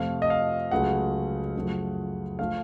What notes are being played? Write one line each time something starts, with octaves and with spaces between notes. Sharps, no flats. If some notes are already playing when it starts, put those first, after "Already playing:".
Already playing: F2 C3 F3 A3 F5
D#5
F5
C#2 C#3 F#3 A3 F#5
F#2 C#3 F3 A3
F3 A3 F5